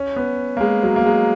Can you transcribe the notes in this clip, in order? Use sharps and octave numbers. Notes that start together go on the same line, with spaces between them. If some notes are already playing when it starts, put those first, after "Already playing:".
Already playing: C#4
B3
A#3
G#3
F#3
A#3
G#3